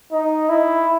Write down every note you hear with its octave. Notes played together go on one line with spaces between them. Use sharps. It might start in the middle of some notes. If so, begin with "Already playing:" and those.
D#4
E4